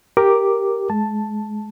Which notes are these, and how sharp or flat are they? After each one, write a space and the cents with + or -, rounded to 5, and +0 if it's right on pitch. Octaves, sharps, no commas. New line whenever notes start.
G4 +0 A#4 +0 D6 +0
G#3 +25 A5 +0